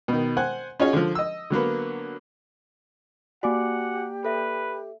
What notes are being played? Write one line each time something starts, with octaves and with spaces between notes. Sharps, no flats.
B2 D#3
C5 F#5 G#5 F#6
C#4 D#4 F4 F#4 G#4 C#5
D3 F3
D#5 E6
D3 F#3 A#3 B3
A#3 F#4 G4 D5 F#5 G#5 D6
A4 B4 E5